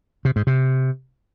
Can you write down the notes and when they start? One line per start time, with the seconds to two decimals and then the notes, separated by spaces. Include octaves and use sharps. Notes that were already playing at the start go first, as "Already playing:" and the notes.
0.25 C3
0.36 G#2
0.47 C3